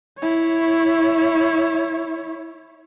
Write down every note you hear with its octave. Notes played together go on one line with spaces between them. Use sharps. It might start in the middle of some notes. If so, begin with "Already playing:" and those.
E4 C#5